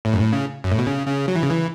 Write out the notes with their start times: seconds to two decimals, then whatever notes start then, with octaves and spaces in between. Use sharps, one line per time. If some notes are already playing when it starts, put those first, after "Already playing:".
0.05 A2
0.14 F#2
0.20 A2
0.33 C#3
0.64 F#2
0.72 A2
0.79 B2
0.87 C#3
1.07 C#3
1.28 F#3
1.35 E3
1.43 C#3
1.50 E3